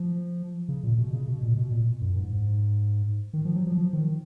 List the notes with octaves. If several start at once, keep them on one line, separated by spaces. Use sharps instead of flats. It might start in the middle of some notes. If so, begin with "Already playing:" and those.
Already playing: F3
C#3
A#2
B2
C#3
B2
A#2
B2
A#2
F#2
G#2
G#2
D#3
F3
F#3
F3
F3
D#3